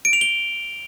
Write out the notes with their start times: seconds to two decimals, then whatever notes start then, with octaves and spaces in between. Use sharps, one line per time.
0.05 D7
0.13 F7
0.21 G7